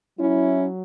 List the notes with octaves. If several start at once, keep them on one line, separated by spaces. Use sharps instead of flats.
F#3 C#4 E4